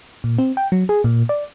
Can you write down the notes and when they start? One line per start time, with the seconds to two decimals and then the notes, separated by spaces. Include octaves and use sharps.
0.24 A#2
0.39 C4
0.57 G5
0.72 F#3
0.89 G#4
1.04 A#2
1.29 D5